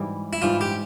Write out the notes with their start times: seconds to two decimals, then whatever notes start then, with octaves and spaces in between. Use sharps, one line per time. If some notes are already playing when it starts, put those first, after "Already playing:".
Already playing: G#2 E3 G3
0.33 E4
0.42 G#2 E3 G3 F4
0.61 G4